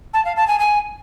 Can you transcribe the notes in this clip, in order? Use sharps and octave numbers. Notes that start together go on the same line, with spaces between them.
A5
F5
A5
G#5
G#5